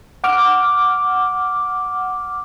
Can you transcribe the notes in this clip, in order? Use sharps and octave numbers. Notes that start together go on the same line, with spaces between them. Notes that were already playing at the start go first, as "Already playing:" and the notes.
F#5 D6 F6